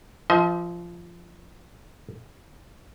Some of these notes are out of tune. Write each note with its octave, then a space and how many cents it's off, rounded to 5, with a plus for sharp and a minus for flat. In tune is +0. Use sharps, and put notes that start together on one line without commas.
F3 -15 D#5 +35